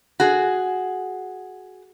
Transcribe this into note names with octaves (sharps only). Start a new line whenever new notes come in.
F#4 G#4